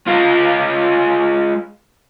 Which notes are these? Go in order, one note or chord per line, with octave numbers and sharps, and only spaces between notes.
G#3 F4